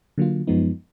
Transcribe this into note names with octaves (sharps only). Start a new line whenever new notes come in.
D3 F#3 A#3 F4
F#2 F3 G#3 B3 D#4